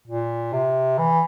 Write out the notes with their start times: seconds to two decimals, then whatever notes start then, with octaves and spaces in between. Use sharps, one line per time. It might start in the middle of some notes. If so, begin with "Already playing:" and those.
0.08 A#2
0.53 C3
0.98 E3